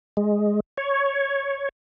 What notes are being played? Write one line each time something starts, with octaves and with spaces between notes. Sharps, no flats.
G#3
C#5